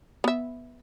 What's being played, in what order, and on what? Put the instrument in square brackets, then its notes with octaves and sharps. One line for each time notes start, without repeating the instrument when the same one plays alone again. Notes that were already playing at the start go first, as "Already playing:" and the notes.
[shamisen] B3 E5